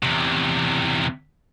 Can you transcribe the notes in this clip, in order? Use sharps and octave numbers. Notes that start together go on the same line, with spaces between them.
E2 C3